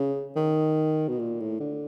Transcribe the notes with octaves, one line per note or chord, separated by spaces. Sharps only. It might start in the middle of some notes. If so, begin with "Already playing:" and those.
Already playing: C#3
D#3
B2
A#2
A2
D3